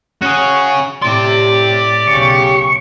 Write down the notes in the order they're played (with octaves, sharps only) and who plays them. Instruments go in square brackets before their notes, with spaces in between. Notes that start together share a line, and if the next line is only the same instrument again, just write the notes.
[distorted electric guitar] C#4 G#4 [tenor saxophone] F#4
[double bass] A2 [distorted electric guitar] G4 C6 [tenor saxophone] D5
[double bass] B1 C#3 [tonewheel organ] C#6